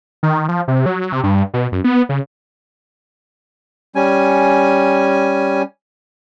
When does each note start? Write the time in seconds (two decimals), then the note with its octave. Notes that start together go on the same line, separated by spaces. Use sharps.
0.23 D#3
0.48 F3
0.68 C3
0.86 F#3
1.12 C3
1.23 G2
1.54 B2
1.72 F#2
1.84 B3
2.09 C#3
3.95 G3 C#4 G#5